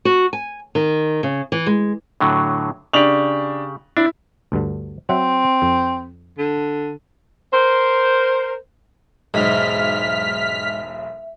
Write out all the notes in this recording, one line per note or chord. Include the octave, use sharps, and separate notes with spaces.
F#4
G#5
D#3
C#3
E3
G#3
A2 D3 F#3
C#3 D4 G4 F7 F#7
D4 E4
D2 G2 D3
F#3 C4 E5 F#5
F2
D3
A#4 C5
E1 B1 G#2 E5 F6 B6